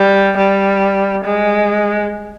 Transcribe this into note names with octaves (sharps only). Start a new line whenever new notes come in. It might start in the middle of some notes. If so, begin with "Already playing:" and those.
Already playing: G3
G3
G#3